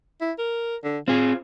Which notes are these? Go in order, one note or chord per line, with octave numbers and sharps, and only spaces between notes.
E4
A#4
D3
C4 F4 G#4